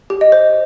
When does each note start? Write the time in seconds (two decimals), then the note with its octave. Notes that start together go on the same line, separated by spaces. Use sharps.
0.10 G4
0.21 D#5
0.32 C5